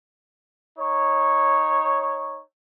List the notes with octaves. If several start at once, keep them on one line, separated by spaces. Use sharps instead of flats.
D#4 C#5